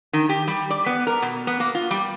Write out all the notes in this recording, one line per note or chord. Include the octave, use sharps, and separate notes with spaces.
D#3
G4
G3
D5
B3
A#4
B2
B3
A#3
F4
G3